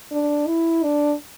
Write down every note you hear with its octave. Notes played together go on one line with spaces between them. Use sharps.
D4
E4
D4